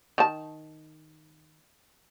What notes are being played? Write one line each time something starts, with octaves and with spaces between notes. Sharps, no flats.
D#3 A5